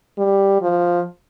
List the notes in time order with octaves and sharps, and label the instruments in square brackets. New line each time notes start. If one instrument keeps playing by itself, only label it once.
[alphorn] G3
F3